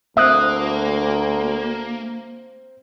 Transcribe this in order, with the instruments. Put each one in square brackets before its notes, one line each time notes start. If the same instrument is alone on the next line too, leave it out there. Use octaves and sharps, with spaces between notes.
[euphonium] D2 [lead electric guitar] A#3 [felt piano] C4 C5 [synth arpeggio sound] E5 D#6 F#6